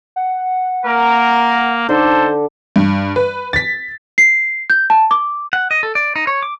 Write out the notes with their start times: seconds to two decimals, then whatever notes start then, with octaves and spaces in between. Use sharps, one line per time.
0.16 F#5
0.85 A#3 A#4
1.89 D3 D#4 A4 C5
2.76 G2
3.16 B4
3.53 A6 B6
4.18 C7
4.70 G6
4.90 A5
5.11 D6
5.53 F#5
5.71 D#5
5.83 A4
5.95 D5
6.16 D#4
6.27 C#5
6.43 D6